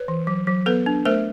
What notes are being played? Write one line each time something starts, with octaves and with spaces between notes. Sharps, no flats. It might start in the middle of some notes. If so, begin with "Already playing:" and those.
Already playing: B4 C#5
E3
F#3
F#3
B3 A4 B4
D4
A3 A#4 C5